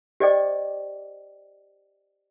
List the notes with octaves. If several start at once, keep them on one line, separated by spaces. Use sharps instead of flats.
G4 C5 D5 D#5 G5 D6